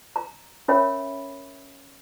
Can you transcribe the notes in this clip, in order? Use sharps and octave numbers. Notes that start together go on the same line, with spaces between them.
A#5
C#4 A#4 C#5 E5 G5 B5